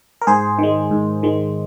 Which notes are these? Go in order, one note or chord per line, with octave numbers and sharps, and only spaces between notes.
A#4
G#2 G#4 C5
D#3 G#3
G#2
D#3 G#3